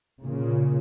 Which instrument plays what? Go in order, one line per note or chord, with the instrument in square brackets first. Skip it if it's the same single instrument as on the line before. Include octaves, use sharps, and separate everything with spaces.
[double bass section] A#2 C#3